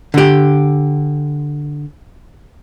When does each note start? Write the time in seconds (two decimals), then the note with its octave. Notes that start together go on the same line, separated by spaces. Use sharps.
0.14 D3 G4